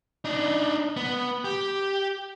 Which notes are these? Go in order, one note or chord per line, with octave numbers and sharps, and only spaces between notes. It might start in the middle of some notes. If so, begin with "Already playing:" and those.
D4 D#4
B3
G4